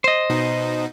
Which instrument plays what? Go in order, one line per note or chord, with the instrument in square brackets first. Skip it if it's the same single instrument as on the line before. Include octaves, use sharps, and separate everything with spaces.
[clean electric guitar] C5 D#5
[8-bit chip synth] B2 D#4